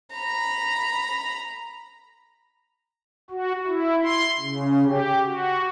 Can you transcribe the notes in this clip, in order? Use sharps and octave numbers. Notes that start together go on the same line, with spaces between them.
A#5 B5
F#4
E4
C6
C#3
G4
F#4